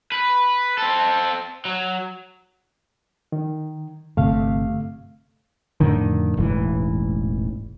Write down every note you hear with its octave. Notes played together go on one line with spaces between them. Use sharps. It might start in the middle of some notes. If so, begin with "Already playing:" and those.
B4
C4 A4
F#3
D#3
G1 C3 A3 F5
F2 A2 D3 D#3
E1 A1 G#2 E3